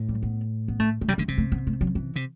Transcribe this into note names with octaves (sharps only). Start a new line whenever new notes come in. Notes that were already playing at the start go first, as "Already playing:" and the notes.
Already playing: A2
G3
B3
B3
A3
A3
C3 G3
D3 A3
C3 G3
A3
B3
A3
F#3
E3
C3